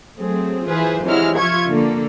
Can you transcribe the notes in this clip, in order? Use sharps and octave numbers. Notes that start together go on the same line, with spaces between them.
F#3 A3 C4 G#4
E3 F4 G#4 B4 C5
C3 E3 F#3 G#3 E4 F6
F3 F4 E5 C#6 G#6
D3 A#3 A4